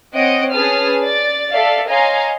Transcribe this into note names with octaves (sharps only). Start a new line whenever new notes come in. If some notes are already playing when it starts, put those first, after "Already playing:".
C4 C#5 D#5 F#5 D#6 D7
C#4 G#4 B4 A5 D#6 F6
D5 A6
A4 D5 E5 F5
C#5 D#5 F5 G#5 A#5 C6